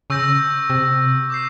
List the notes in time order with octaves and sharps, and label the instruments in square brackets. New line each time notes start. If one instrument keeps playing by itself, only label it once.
[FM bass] C#3 [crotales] C#6 E6 G6 A#6
[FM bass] C3
[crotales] D6 G6 C7